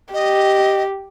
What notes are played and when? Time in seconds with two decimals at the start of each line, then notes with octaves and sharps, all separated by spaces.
0.14 G4 D#5